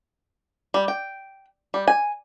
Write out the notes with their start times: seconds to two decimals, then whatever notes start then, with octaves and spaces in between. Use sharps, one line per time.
0.74 G3
0.88 G5
1.74 G3
1.88 G#5